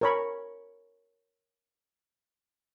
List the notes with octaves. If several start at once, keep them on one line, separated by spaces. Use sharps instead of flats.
A#4 C#5 B5